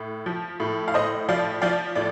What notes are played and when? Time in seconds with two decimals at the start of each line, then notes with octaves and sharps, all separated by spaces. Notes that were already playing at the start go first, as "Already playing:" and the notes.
Already playing: A2
0.26 F3
0.60 A2
0.88 F5
0.94 A2 C5 D#5
1.29 F3 D5 F5
1.62 F3 D5 F5
1.95 A2 D5